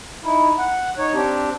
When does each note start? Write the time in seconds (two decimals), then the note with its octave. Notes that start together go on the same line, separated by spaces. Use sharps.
0.24 D#4 E4
0.58 F#5
0.98 D#4 C#5
1.14 C4 D4 G4